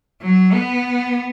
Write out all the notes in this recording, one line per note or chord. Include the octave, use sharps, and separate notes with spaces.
F#3
B3